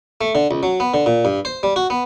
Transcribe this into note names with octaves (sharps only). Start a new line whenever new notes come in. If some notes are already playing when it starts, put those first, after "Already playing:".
A3
D3
C#2
F#3
B3
D3
A#2
G2
C5
G3
F#4
B3